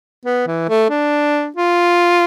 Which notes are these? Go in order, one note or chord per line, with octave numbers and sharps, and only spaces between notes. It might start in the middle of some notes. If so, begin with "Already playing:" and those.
B3
E3
A3
D4
F4